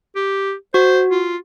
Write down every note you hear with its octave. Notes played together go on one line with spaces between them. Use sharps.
G4
F#4 C5
F4